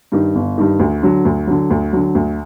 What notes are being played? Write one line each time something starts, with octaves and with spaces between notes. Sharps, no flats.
G2 D#3
G1
G2 D#3
D2
D3 F#3
D2
D3 F#3
D2
D3 F#3
D2